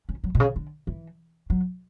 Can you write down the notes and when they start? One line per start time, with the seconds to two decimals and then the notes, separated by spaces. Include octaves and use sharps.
0.09 C#4
0.24 F#3
0.35 B2
0.40 C#3
0.56 D3
0.87 E3
1.50 F#3